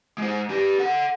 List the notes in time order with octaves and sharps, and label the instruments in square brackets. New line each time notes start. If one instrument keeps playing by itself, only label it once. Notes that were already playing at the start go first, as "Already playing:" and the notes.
[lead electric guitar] G#3 C5
D4 G4
A4 F#5